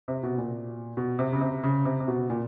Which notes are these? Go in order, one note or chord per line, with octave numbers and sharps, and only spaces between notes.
C3
B2
A#2
B2
C3
C#3
C3
C#3
C3
C3
B2
A#2